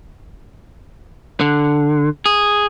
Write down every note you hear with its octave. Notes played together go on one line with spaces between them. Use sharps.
D3
G#4